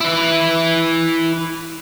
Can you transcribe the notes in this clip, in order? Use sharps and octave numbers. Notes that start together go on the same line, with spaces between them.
E4 B4